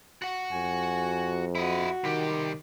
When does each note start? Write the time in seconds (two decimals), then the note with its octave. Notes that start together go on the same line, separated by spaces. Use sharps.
0.22 F#4 F#5
0.52 F2 G#5
1.55 E4 F#4 D#5
2.04 C2 D#3 G4